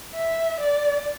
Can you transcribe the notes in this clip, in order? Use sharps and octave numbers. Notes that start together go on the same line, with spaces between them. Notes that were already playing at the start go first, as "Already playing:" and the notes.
E5
D5